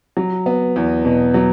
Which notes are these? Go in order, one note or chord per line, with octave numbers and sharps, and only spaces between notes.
F#3
B3
E2
B2
F#3